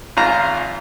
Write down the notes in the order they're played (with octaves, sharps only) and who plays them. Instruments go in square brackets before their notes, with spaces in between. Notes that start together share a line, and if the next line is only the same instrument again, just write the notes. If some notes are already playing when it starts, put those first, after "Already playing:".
[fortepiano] G#1 F4 A#5